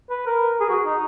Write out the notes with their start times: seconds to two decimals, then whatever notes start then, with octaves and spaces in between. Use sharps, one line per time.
0.10 B4
0.26 A#4
0.60 G#4
0.69 F#4
0.85 D#4